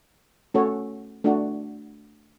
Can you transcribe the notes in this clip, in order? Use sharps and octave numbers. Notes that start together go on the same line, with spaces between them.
A3 C#4 F#4 A4 C#5
A3 D4 F#4